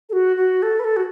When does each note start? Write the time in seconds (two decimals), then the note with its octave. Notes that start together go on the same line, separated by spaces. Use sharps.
0.10 A4
0.13 F#4
0.37 F#4
0.62 A4
0.79 B4
0.84 A4
0.96 F#4